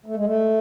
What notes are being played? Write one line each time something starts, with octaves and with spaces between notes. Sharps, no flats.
A3
G#3
A3